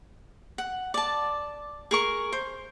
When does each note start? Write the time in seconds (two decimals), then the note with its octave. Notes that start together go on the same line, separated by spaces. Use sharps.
0.58 F#5
0.94 D5 A5
1.91 G#4 A#4 C#6
2.32 C5